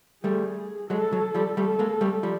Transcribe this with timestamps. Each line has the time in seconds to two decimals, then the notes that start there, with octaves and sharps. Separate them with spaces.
0.24 G3 A3 G#4
0.90 F#3 G#3 A4
1.13 F#3
1.34 F3 G3
1.57 G3 A3 A4
1.79 G#3 A#3
2.01 G3 A3
2.23 F3 G3